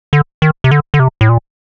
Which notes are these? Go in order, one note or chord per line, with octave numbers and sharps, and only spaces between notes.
D3
D#3
C3
D3
D3
C3
A2
A#2